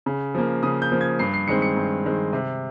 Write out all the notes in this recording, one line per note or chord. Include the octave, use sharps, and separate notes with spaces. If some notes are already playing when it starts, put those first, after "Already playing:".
C#3
F3 A#3
C#3 D#6
G6
F3 A#3
G#6
G2 C7
C7
D#3 G#3 C4 C#7
C#7
G2
D#3 G#3 C4
C3